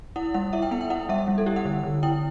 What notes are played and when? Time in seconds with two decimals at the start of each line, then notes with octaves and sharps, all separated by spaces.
0.16 E4 F#5
0.34 G3 F#5
0.53 E4 E5
0.62 G5
0.71 B3 F#5
0.81 G5
0.90 E4 F#5
1.09 G3 E5
1.28 G3
1.38 A4
1.46 E4 G4
1.56 F#5
1.65 D3
1.83 D3
2.03 E4 G5